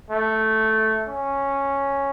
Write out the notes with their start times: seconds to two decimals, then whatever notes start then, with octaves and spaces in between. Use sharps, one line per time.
0.10 A3
1.08 C#4